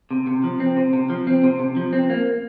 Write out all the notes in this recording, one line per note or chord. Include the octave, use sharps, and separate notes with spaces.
C3
C3
F3
C4
C3
C3
F3
C4
C3
C3
F3
C4
A#3